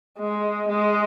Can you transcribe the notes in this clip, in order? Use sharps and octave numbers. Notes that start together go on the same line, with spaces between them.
G#3
G#3